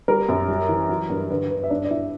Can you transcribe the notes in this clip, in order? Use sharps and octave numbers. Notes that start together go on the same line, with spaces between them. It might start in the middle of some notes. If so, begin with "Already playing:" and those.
G3 A#4
F#2
G3
E3
F#3
G2
D3 B4
D3 B4
E5
G2 D4 D5
D5
G2 E4 E5